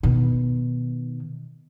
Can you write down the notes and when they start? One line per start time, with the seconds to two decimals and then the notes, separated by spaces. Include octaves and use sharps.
0.03 B2 D#3